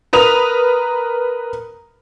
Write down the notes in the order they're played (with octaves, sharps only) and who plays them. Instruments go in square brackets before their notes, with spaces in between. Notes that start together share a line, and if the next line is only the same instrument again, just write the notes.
[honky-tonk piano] A#4 B4 D#6 F7